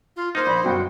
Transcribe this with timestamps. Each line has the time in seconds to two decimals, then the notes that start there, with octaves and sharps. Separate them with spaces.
0.16 F4
0.35 A#3 D#4 C5
0.47 A#1 B5
0.64 G1 F#2 F#4 G5